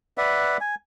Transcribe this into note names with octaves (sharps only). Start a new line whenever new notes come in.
B4 D5 E5 F#5
G#5